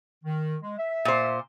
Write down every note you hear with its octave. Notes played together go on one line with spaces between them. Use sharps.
D#3
G#3
E5
A#2 C5